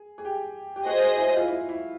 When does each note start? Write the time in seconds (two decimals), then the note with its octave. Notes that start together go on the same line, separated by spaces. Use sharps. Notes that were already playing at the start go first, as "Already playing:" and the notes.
Already playing: G#4
0.18 G#4
0.25 G4
0.76 G4
0.86 F#4 G#4 C5 D#5
1.16 E4
1.37 F4
1.48 E4
1.69 E4